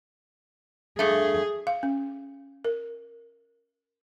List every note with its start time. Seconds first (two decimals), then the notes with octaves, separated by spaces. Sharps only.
0.99 G2 A3 G#4
1.67 F5
1.83 C#4
2.65 A#4